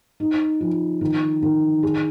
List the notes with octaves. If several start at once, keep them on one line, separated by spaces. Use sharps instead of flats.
D#4
F3
D#3
D#3
G#4